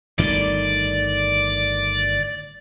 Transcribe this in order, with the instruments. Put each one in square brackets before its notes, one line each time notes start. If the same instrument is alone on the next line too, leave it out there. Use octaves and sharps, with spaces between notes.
[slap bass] G1 A2 D#3 [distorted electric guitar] D5